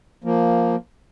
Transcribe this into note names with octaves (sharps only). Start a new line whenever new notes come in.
F3 A#3